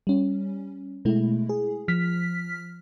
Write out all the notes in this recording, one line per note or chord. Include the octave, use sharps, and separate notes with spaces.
G3 C#4
B2 G#3 A3 E4
G#4
F3 F6 B6